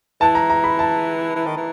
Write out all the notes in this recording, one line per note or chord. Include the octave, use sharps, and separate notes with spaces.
E3 A5
A#5
A#5
B5
A5
E3
D#3
E3